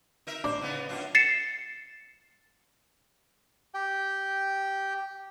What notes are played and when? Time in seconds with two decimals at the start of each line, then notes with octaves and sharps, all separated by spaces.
0.27 D#4 A#4 E5
0.44 D4 C5
0.61 C#3 B3 D#4
0.89 F#2 D4 F4
1.15 A6 C7 C#7 E7
3.74 G4 G5